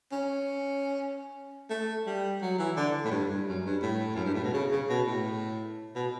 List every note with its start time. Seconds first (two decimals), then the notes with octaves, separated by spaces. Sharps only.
0.12 C#4
1.70 A3
2.06 G3
2.41 F#3
2.59 E3
2.76 D3
3.05 A2
3.11 G2
3.30 G2
3.47 F#2
3.64 G2
3.82 A2
4.15 F#2
4.25 G2
4.34 A2
4.44 B2
4.53 C#3
4.71 C#3
4.89 B2
5.07 A2
5.95 B2